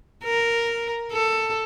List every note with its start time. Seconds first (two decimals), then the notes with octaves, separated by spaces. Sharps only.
0.24 A#4
1.13 A4